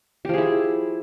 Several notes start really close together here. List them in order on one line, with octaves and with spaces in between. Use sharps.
G4 F3 G#4 E4